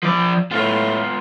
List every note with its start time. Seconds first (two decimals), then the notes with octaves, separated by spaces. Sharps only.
0.03 F3 D5
0.51 A2 B3 F4